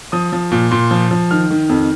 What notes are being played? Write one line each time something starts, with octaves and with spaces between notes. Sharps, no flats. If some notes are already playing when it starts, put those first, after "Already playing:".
F3 D#6
F3
A#2
A#2 C6
F3
F3
D#3 F6
D#3
F2